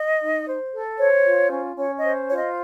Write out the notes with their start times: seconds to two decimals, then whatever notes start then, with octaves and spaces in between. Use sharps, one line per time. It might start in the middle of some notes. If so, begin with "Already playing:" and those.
Already playing: D#5
0.20 D#4
0.46 C5
0.72 A4
0.98 C5 C#5
1.25 F4
1.51 C#4
1.77 C#4 C#5
1.97 D#5
2.04 C5
2.28 F4 C#5
2.36 D#5